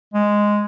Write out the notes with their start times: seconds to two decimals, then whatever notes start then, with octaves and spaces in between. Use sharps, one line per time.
0.14 G#3